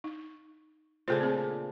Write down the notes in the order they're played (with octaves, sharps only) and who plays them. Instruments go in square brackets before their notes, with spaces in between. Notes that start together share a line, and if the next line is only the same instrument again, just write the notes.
[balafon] D#4
[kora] A#2 C#3 D4 [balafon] A3 A4 C5
[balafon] C4 G#4